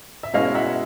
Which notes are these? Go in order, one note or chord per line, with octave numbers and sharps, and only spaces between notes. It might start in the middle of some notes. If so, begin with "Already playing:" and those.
E5
B2 G#3 C#4 E4 D#5 F5
E5 F#5